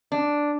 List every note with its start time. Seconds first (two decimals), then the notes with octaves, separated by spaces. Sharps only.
0.12 D4